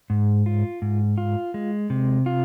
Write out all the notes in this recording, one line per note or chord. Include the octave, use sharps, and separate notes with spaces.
G#2
F4
G#2
F4
G#3
C3
F4